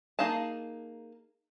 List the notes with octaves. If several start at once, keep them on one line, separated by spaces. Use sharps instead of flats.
A#3 D#4 G#4 F5 A5